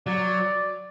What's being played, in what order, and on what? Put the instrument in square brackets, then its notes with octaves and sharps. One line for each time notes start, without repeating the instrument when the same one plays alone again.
[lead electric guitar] F#3 [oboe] D5